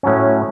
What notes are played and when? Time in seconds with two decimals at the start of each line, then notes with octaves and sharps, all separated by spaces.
0.03 A2 F#3 C#4